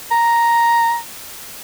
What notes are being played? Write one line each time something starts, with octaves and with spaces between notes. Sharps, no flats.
A#5